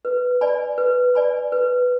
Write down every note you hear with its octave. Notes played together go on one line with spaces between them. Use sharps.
B4
D5 G#5 B5
B4
D5 G#5 B5
B4